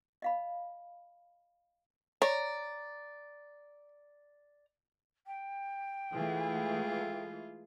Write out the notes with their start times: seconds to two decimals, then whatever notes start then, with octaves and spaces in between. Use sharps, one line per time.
0.22 D#5 F5 B5
2.22 C#5 D5 A#5
5.26 G5
6.13 E3 G#3 A3 F4 G#4